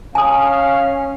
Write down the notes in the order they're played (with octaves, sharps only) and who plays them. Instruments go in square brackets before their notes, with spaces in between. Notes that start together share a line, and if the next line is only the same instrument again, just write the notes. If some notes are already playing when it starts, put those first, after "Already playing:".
[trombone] C#4 [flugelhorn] F5 [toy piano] G#5 D#6